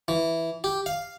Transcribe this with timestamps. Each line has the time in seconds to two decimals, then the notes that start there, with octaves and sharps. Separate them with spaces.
0.08 E3
0.64 G4
0.86 F5